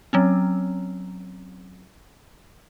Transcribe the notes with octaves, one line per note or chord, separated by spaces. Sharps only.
F#3 C4 C#4